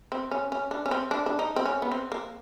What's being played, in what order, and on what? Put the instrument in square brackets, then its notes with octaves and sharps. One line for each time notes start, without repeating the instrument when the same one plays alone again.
[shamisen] C4
C#4
C#4
D4
C#4
C4
D4
D4
D#4
C4
C#4
B3
C4
A#3